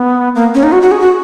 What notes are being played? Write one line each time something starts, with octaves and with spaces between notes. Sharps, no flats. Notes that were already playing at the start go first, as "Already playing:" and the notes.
Already playing: B3
A#3
C#4
D#4
F#4
F#4
G#4
F#4